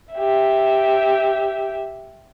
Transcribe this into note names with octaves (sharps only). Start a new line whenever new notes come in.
G4 E5